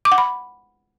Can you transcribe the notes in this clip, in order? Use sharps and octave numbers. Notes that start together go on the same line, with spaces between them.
D6
F#5
B5